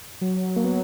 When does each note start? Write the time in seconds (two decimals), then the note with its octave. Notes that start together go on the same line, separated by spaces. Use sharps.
0.21 F#3
0.56 A#3
0.65 B3